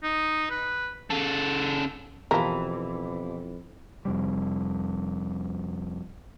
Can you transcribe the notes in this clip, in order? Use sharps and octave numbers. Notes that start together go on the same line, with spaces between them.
D#4
B4
C#3 A4
F2 B2 E3 F3 B3 G4 A#4
F2 C3 G3